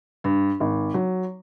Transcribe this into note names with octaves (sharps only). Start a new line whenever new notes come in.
G2
G#1
F#3